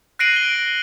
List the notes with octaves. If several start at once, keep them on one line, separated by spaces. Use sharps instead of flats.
F#6 A#6 C7 D7 D#7 F#7
G7